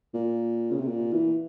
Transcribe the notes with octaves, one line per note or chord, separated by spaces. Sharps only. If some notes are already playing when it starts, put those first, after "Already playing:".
A#2
C#3
C3
A#2
E3